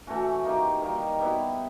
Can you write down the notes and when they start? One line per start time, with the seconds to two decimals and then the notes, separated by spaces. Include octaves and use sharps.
0.07 E3 A3 C#4 F#4
0.45 A#3 D#4 G4
0.82 D#3 G3 A#3
1.19 G3 B3 E4